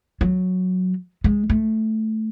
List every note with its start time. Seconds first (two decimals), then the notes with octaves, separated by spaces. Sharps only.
0.21 F#3
1.24 G#3
1.50 A3